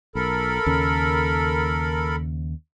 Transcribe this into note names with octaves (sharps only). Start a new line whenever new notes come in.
B1 A4 A#4 B5
D#2 C#3 C#4